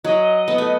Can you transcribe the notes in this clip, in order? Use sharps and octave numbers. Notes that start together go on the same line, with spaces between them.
F#3 D#5
B3
A3